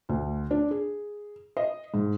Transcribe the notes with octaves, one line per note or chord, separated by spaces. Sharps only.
D2
D4
G#4
D#5
G#2